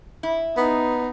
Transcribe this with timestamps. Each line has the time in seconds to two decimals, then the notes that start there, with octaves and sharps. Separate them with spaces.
0.23 E4
0.57 B3 D#4